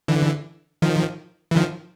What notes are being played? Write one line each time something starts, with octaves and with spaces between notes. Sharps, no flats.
D3 E3
D#3 F3
E3
D#3 F3